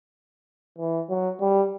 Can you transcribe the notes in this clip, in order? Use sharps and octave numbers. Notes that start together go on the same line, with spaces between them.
E3
F#3
G3